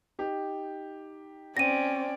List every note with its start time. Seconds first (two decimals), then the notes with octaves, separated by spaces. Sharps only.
0.19 D#4 G4
1.57 C4 C#4 D5 A#6 D#7